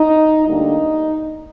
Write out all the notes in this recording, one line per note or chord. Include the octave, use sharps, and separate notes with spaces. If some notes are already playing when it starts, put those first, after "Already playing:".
Already playing: D#4
D2 D3 G3 A#3 D#4